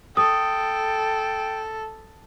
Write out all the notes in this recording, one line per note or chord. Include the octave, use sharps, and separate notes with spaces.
A4 G5 D#6